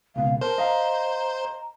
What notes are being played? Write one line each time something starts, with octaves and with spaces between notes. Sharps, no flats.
C#2 B2 F5
A#4 C5 A5
D#5 F5 A#5